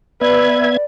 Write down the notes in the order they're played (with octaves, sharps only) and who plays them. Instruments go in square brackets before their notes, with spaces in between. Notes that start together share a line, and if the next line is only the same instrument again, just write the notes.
[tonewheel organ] B3 E5 G#6 [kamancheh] B4 [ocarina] D5